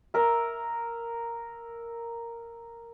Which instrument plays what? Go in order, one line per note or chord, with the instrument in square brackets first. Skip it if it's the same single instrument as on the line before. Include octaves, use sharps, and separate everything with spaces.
[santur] A#4 E5